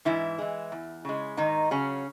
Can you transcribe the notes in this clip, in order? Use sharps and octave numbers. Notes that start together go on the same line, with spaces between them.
G#2 E3 E4
E3 G#3
E2
C#3 G#3
G#2 D#3 D#4
C#3 F#3 C#4